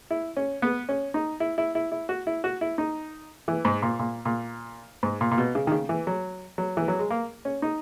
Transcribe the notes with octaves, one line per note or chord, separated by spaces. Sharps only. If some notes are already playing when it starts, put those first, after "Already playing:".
E4
C#4
B3
C#4
D#4
E4
E4
E4
E4
F#4
E4
F#4
E4
D#4
E3
G#2
A#2
A#2
A#2
G#2
A#2
A#2
B2
C#3
D#3
C#3
E3
F#3
F#3
E3
F#3
G#3
A#3
C#4
D#4